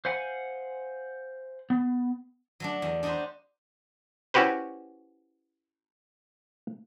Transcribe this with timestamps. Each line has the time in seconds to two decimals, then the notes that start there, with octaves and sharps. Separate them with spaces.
0.05 C5 F5 F#5 G#5
1.70 B3
2.60 F#3 A3 D4
2.82 E2
3.03 D4 D#4 F#4 G4 C5
4.34 C#4 E4 F#4 G4 B4 C5